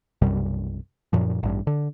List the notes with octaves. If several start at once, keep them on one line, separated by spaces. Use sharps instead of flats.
B1 F#2 C3 G3
F#2 A#2 F3
A1 G2
D3